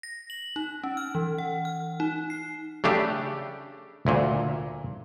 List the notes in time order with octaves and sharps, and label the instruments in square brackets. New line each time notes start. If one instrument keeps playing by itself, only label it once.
[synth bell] A#6
F#7
D#4
C#4
F6
E3
F#5
F6
D#4
C7
[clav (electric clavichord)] C#3 A3 D4 G4
D2 A#2